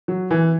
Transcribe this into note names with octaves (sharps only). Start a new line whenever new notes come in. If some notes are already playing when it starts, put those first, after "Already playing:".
F#3
E3